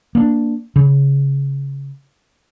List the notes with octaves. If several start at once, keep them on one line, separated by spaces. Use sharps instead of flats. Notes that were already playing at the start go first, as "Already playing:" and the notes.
A#3 C#4 D4
C#3